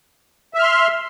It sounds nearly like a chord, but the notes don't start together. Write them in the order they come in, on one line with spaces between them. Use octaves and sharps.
E5 F6 C6